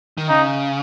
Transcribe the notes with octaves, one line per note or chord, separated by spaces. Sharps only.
D#3
C#3 D#4